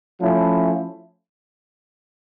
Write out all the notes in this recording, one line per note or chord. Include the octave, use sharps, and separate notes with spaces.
F3 A3 C#4 E4